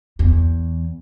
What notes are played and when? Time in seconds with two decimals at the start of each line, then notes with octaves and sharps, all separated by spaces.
0.19 E2